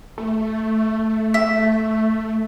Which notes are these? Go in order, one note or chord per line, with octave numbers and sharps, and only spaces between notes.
A3
E5